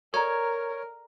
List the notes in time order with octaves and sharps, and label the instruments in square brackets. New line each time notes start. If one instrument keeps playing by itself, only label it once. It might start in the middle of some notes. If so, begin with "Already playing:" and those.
[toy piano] A4 D5 A#5 [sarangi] A#4 [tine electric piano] C#5